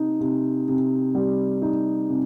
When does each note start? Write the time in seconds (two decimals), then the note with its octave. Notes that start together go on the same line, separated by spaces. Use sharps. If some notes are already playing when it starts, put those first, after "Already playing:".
Already playing: C3 D#4
0.20 C3
0.68 C3
1.15 G3
1.62 D#4
2.10 C3